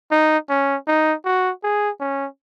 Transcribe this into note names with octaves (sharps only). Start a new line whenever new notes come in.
D#4
C#4
D#4
F#4
G#4
C#4